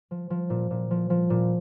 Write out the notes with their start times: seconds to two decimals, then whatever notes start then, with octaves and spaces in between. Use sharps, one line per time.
0.11 F3
0.30 F3
0.50 A#2
0.71 A#2
0.91 F3
1.10 F3
1.30 A#2